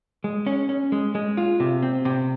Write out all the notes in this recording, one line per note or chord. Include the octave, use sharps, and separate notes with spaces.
G#3
C#4
C#4
G#3
G#3
F4
C3
C4
C3